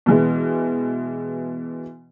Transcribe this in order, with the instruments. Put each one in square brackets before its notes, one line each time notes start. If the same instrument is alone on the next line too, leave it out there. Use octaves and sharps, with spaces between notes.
[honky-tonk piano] B2 E3 G#3